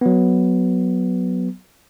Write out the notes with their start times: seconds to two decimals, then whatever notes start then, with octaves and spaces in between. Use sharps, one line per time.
0.01 F#3 B3